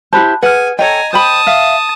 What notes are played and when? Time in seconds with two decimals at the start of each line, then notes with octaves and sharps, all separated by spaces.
0.13 E4 G4 C5 A5 B5 F#6
0.43 G#4 B4 F#5 G#5 F6
0.79 A4 C#5 D#5 G5 G#5 A#5
1.13 C5 G5 A5 B5 D#6
1.47 E5 F5